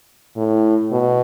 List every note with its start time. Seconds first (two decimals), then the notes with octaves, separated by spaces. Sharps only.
0.36 A2
0.92 B2